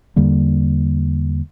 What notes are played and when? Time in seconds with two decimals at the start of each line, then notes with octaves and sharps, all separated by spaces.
0.16 E2 D3 G3 A#3